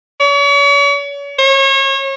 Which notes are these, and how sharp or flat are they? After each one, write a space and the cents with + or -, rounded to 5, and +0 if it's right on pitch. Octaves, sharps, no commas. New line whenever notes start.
C#5 +40
C#5 -30